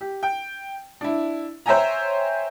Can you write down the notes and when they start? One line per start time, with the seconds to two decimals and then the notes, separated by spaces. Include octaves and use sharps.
0.01 G4
0.23 G5
1.01 D4 E4
1.66 C5 C#5 E5 G5 G#5 A#5